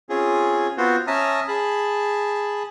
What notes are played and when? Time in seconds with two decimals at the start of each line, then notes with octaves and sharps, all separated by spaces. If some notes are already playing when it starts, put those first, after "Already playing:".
0.09 C4 C#4 F4 G#4
0.78 B3 C4 F4 F#4 C5
1.07 C#4 E5 A5 A#5 D#6 F6
1.48 G#4 A5 B5